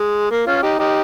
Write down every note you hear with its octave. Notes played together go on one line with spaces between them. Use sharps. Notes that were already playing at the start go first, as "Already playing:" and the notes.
Already playing: G#3
A#3
C#4 F4
D#4 G4
D#4 G4